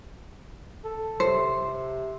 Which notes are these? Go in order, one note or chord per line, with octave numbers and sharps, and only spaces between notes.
A4
C3 C5